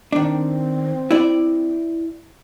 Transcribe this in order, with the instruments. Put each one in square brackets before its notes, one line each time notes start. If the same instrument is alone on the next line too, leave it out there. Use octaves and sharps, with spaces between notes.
[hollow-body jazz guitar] D#3 D4 [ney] C4
[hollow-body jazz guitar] E4 D5